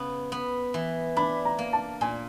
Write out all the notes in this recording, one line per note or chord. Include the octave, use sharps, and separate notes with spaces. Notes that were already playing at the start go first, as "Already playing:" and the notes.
Already playing: C#3 B3
B3
E3
D4 B5
A#5
A#3
A5
A#2 G#5